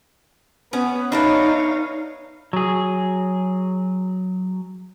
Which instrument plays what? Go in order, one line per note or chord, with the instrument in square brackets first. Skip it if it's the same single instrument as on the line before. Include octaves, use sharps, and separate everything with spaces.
[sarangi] B3 [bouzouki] C#4
[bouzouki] D4 B4 E5 [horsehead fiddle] D#4 F5 [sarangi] C#5
[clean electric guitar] F#3 G#4